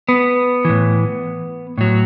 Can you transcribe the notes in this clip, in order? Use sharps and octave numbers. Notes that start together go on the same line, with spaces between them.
B3
A2 E3
A2 F#3